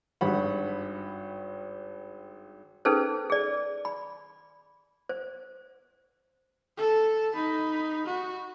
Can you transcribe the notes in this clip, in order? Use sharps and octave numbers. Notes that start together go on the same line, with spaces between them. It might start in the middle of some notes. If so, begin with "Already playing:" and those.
G#1 G2 F#4 F#5 B5
C#4 D#4 G#4 A4 B4 C5
G#4 D5
B5
C5
A4
D#4 B5
F#4